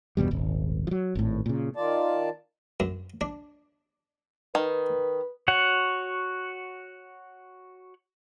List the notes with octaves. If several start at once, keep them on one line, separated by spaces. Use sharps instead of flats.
G1 E2 B2 G3
D#1 G#1
F3 F#3
G#1 A2
A#2 C#3
D#3 F4 D5 A5
F#2
D4
D#3 B4
F#4 C#5 F#5